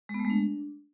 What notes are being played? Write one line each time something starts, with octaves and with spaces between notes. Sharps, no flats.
G#3
B3
A3
G#3
D4